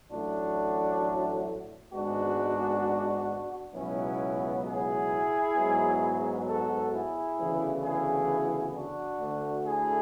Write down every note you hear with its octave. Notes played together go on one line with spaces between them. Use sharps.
A1 A2 F#3 A3 D4 F#4
G#1 G#2 G#3 B3 D4 F#4
C#2 B2 F#3 B3 C#4 E4
E4 G#4
G#2 F#3 B3
F#4 A4
E4 G#4
D2 C#3 E3 B3
E4 G#4
D4 F#4
D2 D3 A3
E4 G#4